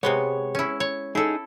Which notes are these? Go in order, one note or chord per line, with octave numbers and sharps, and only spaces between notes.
C3 G#3 B3 C#5
C#4 E4
C#5
D#4 E4 G#4 A4